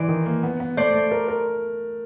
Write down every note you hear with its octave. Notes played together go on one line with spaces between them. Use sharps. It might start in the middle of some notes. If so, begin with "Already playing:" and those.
Already playing: E3 C5 D5
D#3
A#3
B3
B3
A3 C5 D5
A3
A#4
A#4